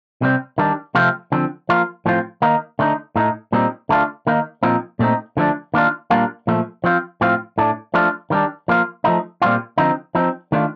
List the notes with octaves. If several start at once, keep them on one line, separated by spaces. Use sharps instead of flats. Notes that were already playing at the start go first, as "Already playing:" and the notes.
C3 G3 C4
D#3 G3 D4
C3 F3 A3 C4 F4
D3 F3 C4
F3 A#3 F4
A2 F3 C4 F4
D#3 A#3 D#4
D3 A3 C4 D#4
A2 A3 D#4
A#2 G3 C4 D#4
D3 A3 D4 F4
D#3 A#3 D#4
A#2 F3 C4 D#4
A#2 A3 C4 D#4
D3 F3 A3 D4
D#3 A#3 D4 F4
A#2 G3 A#3 D4 F4
A#2 F3 A3
F3 C4 F4
A2 F3 C4 F4
A2 A3 D4
F3 A3 D4 F4
D#3 G3 D4
F3 A#3 F4
F3 A3 D#4
A#2 G3 C4 F4
D3 F3 C4 D#4
F3 C4 D#4
D#3 A3 D4 F4